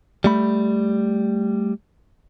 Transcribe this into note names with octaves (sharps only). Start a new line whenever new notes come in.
G3 A3 B5